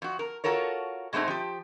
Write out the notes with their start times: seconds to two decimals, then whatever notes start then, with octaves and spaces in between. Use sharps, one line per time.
0.02 F2 F#4
0.19 A#4
0.44 F4 F#4 A4 A#4 C#5
1.13 B2 G#3 A3 C4 D#4
1.28 F3 G4